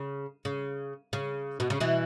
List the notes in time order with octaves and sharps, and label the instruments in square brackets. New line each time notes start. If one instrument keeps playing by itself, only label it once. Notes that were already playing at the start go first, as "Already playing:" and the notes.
Already playing: [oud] C#3
C#3
C#3
B2
C#3
B2 E3